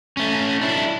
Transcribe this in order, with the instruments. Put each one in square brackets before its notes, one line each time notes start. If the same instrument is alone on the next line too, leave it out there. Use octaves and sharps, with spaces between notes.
[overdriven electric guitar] A3 C#4
D4 E4